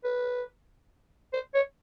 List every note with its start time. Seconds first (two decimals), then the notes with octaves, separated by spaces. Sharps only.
0.04 B4
1.33 C5
1.54 C#5